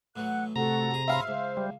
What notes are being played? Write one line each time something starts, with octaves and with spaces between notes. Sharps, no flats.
A2 E3 F#3 F#5 F#6
A2 C3 F#4 A4 F#5 A#5
F2 G#4
G#2 F#4 C#5 E5 F5 B5 C6
C#2 C5
G3